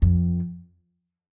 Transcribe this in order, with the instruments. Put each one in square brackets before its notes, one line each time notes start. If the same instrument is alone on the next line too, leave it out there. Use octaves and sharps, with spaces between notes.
[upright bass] F2